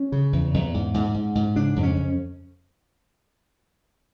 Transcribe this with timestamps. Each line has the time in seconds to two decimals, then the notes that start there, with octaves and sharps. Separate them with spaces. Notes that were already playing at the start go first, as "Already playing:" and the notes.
Already playing: C#4
0.12 C#3
0.33 E2
0.54 E2
0.74 G#2
0.94 G#2
1.14 G#2
1.35 G#2
1.56 C#3 D4
1.76 F2
1.83 C#4
1.97 F2